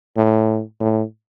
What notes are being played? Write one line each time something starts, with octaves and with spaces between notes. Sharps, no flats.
A2
A2